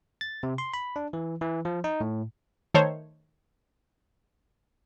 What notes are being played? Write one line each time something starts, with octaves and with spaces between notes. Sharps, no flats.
A6
C3
C6
B5
D4
E3
E3
F3
D#4
A2
D#3 A3 C5 C#5